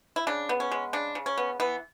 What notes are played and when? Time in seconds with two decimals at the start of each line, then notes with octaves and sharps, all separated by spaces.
0.16 E4
0.27 C#3 D4
0.49 B3
0.60 C#4
0.72 G#3
0.93 C#3 D4
1.15 C#3
1.26 C#4
1.37 B3
1.60 E3 B3